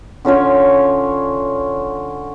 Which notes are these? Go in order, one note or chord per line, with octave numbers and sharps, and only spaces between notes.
D3 C#4 F4 C#5